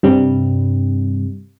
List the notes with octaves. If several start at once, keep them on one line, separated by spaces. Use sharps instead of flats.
G2 C3 G3